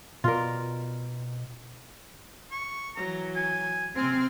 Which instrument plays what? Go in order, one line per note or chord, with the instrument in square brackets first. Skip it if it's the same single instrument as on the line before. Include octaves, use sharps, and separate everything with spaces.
[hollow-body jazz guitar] B2 D5 [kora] F4 A#4
[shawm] C#6
[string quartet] E3 F#3 [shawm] A#5
[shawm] G#5
[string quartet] C3 F6 [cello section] C4 [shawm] G#5